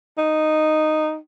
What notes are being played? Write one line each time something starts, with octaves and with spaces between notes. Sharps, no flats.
D#4